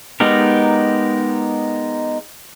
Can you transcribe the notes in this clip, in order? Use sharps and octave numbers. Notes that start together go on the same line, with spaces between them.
G#3 B3 D#4 G4 A#4